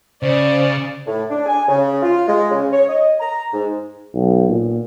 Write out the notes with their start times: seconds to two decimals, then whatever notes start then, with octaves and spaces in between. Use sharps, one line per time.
0.23 C#3 C5 D5
1.07 A2
1.30 D4
1.46 G#5
1.68 C#3
2.03 F4
2.27 G#3
2.51 C#3
2.72 C#5
2.88 D#5
3.20 A#5
3.52 G#2
4.14 B1
4.49 A#2